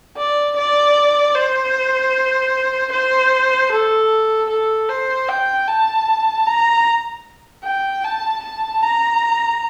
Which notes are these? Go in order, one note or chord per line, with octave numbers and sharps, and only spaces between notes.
D5
D5
C5
C5
A4
A4
C5
G5
A5
A#5
G5
A5
A5
A#5